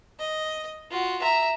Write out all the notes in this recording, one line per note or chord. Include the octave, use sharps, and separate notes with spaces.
D#5
F4 F#4
E5 A#5